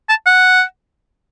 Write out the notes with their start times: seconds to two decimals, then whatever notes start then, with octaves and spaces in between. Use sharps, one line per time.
0.09 A5
0.26 F#5